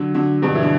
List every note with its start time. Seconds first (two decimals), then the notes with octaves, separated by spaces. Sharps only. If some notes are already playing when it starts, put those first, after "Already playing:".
Already playing: D3 F#3
0.14 D3 F#3
0.42 G2 B2
0.55 E3
0.63 D3